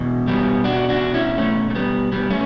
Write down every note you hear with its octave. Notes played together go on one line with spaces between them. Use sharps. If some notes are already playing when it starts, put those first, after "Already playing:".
Already playing: E2 B2
G3 B3
D4 F#4
D4 F#4
C#4 E4
A3 C#4
A3
G3 B3
G3 B3
A3 C#4